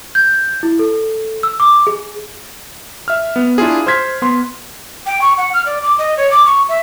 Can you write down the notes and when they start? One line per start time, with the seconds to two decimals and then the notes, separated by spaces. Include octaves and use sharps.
0.15 G6
0.63 E4
0.79 A4
1.43 E6
1.60 D6
1.87 G#4
3.08 E5 F6
3.36 B3
3.58 D4 E4 F4 G#4
3.87 C5 C6 F6 G#6 B6
4.22 B3 C6
5.06 G5
5.21 C#6
5.38 F#5
5.54 F6
5.66 D5
5.83 D6
5.98 D#5
6.17 C#5
6.31 D6
6.46 C#6
6.69 E5